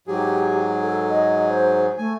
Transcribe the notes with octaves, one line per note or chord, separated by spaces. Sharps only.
G#2 F#3 G4 G#4
A4
D#5
C5
A3 G#5